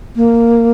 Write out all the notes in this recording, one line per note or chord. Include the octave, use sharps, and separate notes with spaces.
A#3